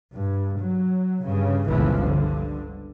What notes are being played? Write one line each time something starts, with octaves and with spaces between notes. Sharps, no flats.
G2
F#3
G2 C#3
G1 C#2 A#2 E3 F3
G2 D3